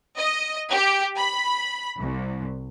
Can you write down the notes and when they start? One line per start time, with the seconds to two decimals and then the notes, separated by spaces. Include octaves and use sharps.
0.18 D#5
0.72 G4
1.17 B5
2.01 C2